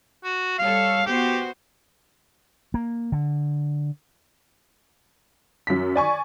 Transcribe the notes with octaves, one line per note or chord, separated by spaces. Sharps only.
F#4
G3 A4 C#5 F5
B3 F#4 G4 C5
A#3
D3
F#2 B6
D5 G#5 C#6